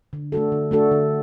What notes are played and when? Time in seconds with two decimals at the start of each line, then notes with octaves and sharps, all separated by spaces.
0.13 D3
0.32 A3 D4 F#4 A4
0.52 D3
0.71 A3 D4 F#4 A4
0.92 D3